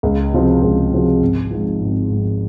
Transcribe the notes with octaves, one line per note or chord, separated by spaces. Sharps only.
C#2
C3 F3 C4 F#4
C#2
C3 F3 C4 F#4
G#1
G#2 F3
G#1
G#2 F3